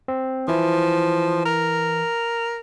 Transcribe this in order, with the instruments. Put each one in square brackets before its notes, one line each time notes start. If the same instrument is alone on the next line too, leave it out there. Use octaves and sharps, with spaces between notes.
[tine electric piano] C4
[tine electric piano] E3 E4 [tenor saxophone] F3
[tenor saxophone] A#4